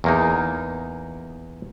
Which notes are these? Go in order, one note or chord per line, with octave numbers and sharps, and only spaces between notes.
E2 A#3 D#4